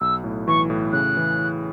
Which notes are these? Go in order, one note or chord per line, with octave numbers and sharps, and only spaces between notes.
B1 E6
A2
E3 C#6
A2
C#3 F#6
E3
E3